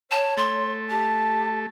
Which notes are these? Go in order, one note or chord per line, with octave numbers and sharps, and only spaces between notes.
C#5 A5
A3 C6
G4 A5